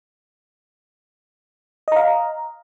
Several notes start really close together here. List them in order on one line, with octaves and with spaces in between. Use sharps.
D#5 A#5 F5